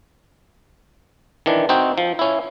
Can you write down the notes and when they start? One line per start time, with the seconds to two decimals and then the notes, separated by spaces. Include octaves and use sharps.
1.46 D#3 E3 D4
1.69 C4 D#4 F#4 G5
1.98 F3
2.19 C#4 E4